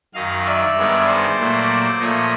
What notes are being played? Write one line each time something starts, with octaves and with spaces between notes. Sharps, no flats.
F#2 D#3 F#3 D#5 F5
D5 E5
G2 D#3 G#3 B3
C5 D5
A#2 F#3 A3
A#2 F3 A3 C#5 D#5